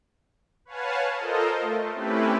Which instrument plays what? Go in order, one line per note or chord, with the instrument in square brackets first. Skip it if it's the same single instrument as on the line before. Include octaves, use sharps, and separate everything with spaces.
[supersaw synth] B4 C#5 F5 F#5 G#5 A5
F4 A4 A#4 C5 D#5
A3
A3 C4 C#4 E4 G4 B4